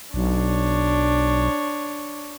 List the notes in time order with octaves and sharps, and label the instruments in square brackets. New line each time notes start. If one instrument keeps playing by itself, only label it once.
[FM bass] B1 [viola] D4 C#5